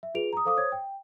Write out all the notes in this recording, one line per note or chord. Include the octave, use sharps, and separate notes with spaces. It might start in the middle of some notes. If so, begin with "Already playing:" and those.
E5
F4 G#4 B4 D7 F7
A#5 D#6
A4 C5 F5 D6 D#6
C5 C#5 D#6 G#6
G5